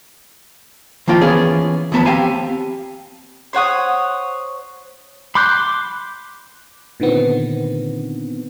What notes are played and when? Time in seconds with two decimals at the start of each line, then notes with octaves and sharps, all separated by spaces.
1.07 D#3 F3 A#3 F4 G5
1.21 E3 B3 C#4 G#4
1.92 D#2 F3 B3 A5 B5
2.05 C4 G4 F5 G#5 A5 B5
3.53 C5 C#5 F#5 D#6
5.35 B5 C6 D6 F#6 G6
7.00 A#2 D3 D#3 B3 C4